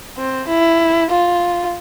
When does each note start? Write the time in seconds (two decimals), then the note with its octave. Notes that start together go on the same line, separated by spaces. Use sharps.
0.18 C4
0.48 E4
1.10 F4